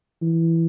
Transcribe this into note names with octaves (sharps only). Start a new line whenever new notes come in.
E3